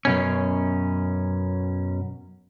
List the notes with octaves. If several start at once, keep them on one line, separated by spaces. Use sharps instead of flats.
F#2 B2 C#4